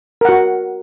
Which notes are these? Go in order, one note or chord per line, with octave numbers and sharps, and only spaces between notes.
F#4 A#4 F#5